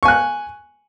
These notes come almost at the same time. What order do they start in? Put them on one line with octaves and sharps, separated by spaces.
C#6 G#5 F#6